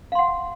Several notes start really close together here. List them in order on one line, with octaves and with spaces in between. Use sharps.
F5 C6 F#5